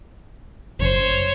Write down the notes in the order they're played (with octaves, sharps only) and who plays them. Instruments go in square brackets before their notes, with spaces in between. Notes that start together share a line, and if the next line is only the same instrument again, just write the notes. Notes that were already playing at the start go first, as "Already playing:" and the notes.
[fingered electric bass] G1 F#2 C#3 [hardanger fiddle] C5 C#5